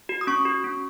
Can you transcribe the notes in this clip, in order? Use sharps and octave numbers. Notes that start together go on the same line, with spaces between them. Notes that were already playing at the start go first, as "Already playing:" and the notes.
F#4
D#6
C#4 C#6
F#4
C#4